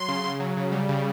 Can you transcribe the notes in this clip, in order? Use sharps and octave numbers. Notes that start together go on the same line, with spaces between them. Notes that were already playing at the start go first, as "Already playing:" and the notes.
Already playing: F#3 C6
C#3
C#3
F#3
C#3
G3
C#3